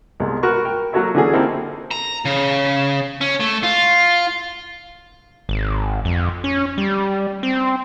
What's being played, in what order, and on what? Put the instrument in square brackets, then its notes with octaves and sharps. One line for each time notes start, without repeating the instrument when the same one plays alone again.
[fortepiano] C2 B2 G#3
F#4 A#4 B4 C#6
A#4 G5
F#3 A#3 F#4 A4 C#5 E5
D3 E3 C#4 F#4 G#4 A4
A#3 C4 D#4 E4 G4 A4
[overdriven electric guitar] A#5
C#3
C#4
A3
F4
[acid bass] G#1
F2
C#4
G3
C4